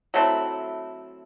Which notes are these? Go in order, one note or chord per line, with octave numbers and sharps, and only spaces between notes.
F#3 A3 C4 E4